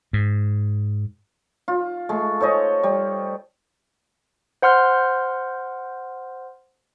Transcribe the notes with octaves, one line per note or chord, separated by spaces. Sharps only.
G#2
F4
G#3 A3
A4 C5 C#5 D#5
G3
C5 F#5 C6 F6 G6